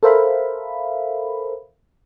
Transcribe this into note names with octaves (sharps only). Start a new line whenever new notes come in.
A4 A#4 C5 E5 F5 B5